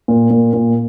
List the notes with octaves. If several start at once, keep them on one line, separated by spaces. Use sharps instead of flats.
A#2
A#2
A#2